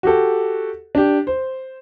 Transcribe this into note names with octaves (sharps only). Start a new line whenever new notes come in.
F#4 G4 A4
D4 G4
C5